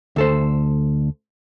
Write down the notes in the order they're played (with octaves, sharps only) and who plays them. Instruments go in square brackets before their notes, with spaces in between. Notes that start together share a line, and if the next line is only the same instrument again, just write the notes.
[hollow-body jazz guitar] D2 A4 C5